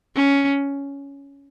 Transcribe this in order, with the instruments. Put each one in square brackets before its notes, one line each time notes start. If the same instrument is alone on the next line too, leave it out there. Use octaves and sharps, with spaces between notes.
[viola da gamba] C#4